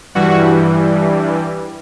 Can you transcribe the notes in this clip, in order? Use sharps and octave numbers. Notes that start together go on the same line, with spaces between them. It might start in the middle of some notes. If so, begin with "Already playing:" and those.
G2 E3 G3 F#4